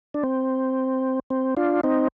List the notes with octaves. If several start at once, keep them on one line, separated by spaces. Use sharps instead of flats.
D4
C4
C4
D4 F4
C4 D#4